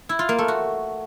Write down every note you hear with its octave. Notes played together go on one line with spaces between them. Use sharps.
E4
F4
A#3
A3
F#4